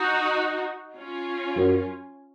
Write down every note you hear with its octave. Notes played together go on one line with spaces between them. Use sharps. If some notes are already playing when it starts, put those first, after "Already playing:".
Already playing: D#4 F#4
C#4 F4
F#2